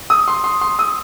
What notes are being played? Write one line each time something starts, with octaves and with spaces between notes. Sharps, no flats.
D#6
C6
C6
C6
D#6